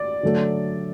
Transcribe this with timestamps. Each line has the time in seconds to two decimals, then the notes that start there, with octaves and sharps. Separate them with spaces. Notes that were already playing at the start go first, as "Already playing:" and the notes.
Already playing: D5
0.23 D3 F#3 A3